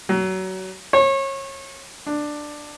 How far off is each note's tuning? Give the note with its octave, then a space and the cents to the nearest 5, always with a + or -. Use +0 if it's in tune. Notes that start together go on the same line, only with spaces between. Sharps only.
F#3 +25
C#5 -30
D4 +10